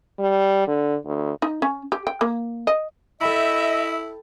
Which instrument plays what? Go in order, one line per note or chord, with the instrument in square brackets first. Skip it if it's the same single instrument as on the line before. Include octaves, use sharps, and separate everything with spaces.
[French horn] G3
D3
D2
[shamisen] D#4
C#4
G4
G5
A#3
D#5
[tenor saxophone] E4 [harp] A4 G5 B5 [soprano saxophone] D#5 [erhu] E5